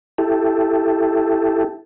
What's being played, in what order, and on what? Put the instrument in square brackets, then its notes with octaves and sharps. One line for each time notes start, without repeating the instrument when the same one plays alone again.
[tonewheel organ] E4 G4 A4